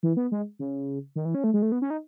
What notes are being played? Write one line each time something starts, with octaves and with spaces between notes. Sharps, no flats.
E3
B3
G#3
C#3
D#3
E3
C#4
A3
G#3
A3
B3
C#4
D#4